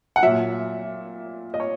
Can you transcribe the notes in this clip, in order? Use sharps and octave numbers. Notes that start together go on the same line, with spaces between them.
F#5
A#2 F#3 E5
D#5
C#5